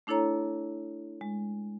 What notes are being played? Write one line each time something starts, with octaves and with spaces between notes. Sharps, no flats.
A3 D4 E4 A4 C#5 A#5
G#3